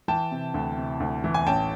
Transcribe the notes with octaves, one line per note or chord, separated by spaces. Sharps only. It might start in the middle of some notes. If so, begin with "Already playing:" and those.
E3 G5 A5
C3
D2
C3
D2
E3
G#5
A1 G5 A5